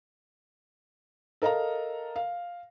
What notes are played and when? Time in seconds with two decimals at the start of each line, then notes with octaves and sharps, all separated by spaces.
1.42 A4 A#4 D#5 F5 A#5
2.16 F5